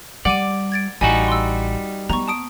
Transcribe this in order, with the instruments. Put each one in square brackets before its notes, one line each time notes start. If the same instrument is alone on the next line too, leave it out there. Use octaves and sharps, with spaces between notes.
[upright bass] G3 [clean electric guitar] D5 [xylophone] F#5 D6 D#7
[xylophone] G#6 A6 D7
[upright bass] A1 [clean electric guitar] G3 D#4 F#4 [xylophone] G#5
[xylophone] C6 E6
[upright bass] B3 [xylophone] A#5 C#6
[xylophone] A5 D#6 D7